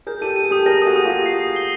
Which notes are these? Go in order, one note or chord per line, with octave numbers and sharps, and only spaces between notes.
G#4 A#4 G6
G4 A4 D#7
D#7
G#4
G4 A4 D#6
G#4 A#4 A#6
F#4 G#4 D#6
D#6
F4 G4
A#6
C7
C7
G7